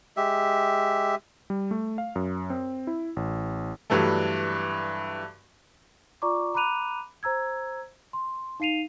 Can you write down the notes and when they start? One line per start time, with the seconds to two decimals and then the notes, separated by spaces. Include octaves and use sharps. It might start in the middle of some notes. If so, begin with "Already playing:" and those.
0.17 G#3 G4 E5
1.50 G3
1.71 A3
1.98 F5
2.16 F#2
2.50 C4
2.87 E4
3.16 A1
3.90 G2 E3 F#3 A3
6.22 F4 D5 A#5 C#6 D6
6.54 A#5 B5 D6 F#6 D#7 F7
7.23 C5 A#5 E6 G#6
8.13 C6
8.60 D#4 F5 C7 D#7 F7